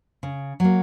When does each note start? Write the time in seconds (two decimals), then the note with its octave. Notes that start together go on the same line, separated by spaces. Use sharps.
0.23 C#3
0.60 F#3 A#3